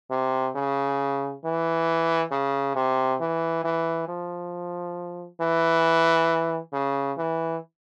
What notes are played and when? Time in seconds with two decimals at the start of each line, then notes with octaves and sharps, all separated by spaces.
0.11 C3
0.55 C#3
1.44 E3
2.31 C#3
2.75 C3
3.20 E3
3.64 E3
4.08 F3
5.41 E3
6.73 C#3
7.18 E3